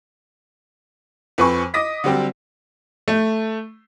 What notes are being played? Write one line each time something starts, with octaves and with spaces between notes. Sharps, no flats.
F2 C4 B4 G#5 B5 C#6
D#5 D6 D#6 A#6 B6
D3 F#3 G3 C4 G4
A3